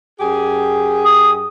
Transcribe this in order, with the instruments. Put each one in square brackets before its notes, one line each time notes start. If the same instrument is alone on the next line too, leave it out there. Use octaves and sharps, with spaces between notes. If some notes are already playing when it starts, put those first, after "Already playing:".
[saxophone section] F#2 G4 G#4
[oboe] D#6